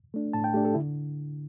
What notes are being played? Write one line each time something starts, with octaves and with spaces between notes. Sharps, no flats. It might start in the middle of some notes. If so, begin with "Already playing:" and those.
A3 D4
A2 A5
G5
A3 D4 G4
A4
D3 E4